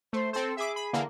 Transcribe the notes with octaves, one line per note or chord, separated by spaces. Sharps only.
A3 C5
C4 A4 C5
G#4 E5 B5 D6
B5
D3 E3 A#3